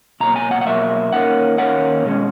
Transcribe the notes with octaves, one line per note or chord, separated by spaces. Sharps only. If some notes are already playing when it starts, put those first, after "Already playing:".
B2 F#3 A#3 A#5
G#5
F#5
F#5
B2 F#3 A#3 E5
D#2 D#3 A#3 C#4 F#5
D#2 D#3 A#3 C#4 F#5
B2 G#3 C#4